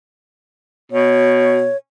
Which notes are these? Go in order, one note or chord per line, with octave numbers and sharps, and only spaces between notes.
B2 C#5